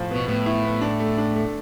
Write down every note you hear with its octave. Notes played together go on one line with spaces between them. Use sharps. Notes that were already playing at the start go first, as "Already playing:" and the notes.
Already playing: A2 F3
B2 B3
A2 B3
E4
B3
D4
A3
D4
A3